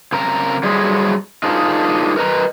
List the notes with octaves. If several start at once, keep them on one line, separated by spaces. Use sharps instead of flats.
C#3 C4 A#4 A#5
F#3 G3 E4 G#4 C5
D4 D#4 F4 G#4 A#4 C5
A#4 B4 D#5 A#5